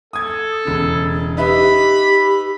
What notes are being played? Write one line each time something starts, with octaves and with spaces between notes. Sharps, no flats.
A4 D#6 G#6
E1 C#3
D#4 G4 B4 E5 B5